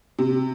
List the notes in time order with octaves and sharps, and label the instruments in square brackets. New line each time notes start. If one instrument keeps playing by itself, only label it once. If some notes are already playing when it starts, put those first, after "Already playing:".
[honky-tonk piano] C3